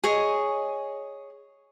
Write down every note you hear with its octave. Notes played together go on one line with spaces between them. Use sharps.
G#4 C#5 D#5